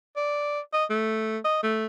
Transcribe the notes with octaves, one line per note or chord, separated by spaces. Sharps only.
D5
D#5
A3
D#5
A3